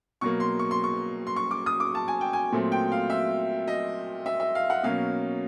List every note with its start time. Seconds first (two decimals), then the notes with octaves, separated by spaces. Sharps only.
0.21 B2 F#3 A#3 C#6
0.40 C6
0.59 C#6
0.71 C6
0.84 C#6
1.27 C6
1.36 C#6
1.51 D6
1.66 D#6
1.80 D6
1.95 A5
2.08 G#5
2.21 G5
2.33 G#5
2.52 A#2 F#3 A3 C4
2.72 G5
2.92 F5
3.10 E5
3.68 D#5
4.26 E5
4.40 E5
4.55 F5
4.70 F#5
4.83 B2 F#3 A#3 C#4 F5